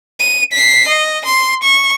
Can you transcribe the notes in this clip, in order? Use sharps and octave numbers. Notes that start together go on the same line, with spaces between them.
D#7
B6 C7
D#5
C6
C#6